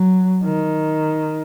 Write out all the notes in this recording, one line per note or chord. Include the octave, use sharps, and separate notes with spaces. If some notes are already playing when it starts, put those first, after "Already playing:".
Already playing: F#3
D#3